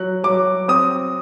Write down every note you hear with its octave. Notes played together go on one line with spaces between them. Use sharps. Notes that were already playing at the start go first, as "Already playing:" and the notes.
Already playing: F#3 F#6
F#3 D6
C4 D#6